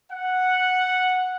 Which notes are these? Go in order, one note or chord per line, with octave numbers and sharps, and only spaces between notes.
F#5